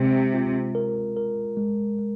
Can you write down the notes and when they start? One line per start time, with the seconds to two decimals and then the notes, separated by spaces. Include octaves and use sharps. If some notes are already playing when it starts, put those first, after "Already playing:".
Already playing: C3 G#3
0.34 F4
0.75 A#4
1.17 A#4
1.57 G#3
1.99 G#3